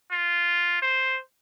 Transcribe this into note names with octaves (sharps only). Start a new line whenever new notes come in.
F4
C5